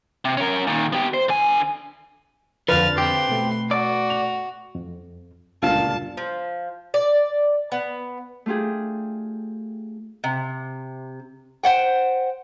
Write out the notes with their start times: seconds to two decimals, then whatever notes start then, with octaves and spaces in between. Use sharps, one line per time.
0.25 C3
0.37 C#4 A#4
0.67 A#2 D#3
0.93 B3 G4
1.14 C5
1.29 D3 G#5
2.68 F2 D3 F3 B4 F5 F6 A6
2.98 C4 G4 C6
3.29 B2 A3
3.71 F#4 D5
4.10 F7
4.75 F2
5.62 G1 C#2 F#2 A#2 D5 F5 A5
6.17 F3
6.94 D5
7.72 B3
8.46 A3 D4 F4 G4 G#4
10.24 C3
11.64 C5 F#5 G5